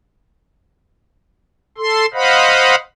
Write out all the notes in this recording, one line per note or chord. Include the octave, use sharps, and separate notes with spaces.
A4 C6
C5 D#5 F5 F#5 B5